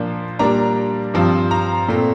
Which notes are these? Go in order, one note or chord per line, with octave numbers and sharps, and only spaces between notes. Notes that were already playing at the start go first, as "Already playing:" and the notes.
Already playing: A#2 F3 A#3 D4
A#2 G3 A#3 D4 A#5
G2 F3 C4
A#5
A#2 A3 C4